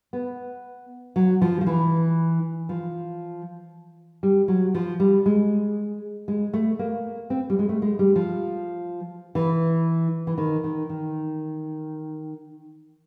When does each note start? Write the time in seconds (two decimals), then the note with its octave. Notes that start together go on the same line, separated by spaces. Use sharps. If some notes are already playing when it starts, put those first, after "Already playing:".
0.13 B3
1.16 F#3
1.42 F3
1.61 F3
1.67 E3
2.69 F3
4.23 G3
4.48 F#3
4.75 F3
5.00 G3
5.26 G#3
6.28 G#3
6.53 A3
6.79 A#3
7.30 C4
7.50 G3
7.59 G#3
7.69 A3
7.82 G#3
7.99 G3
8.16 F3
9.35 E3
10.27 E3
10.38 D#3
10.64 D#3
10.89 D#3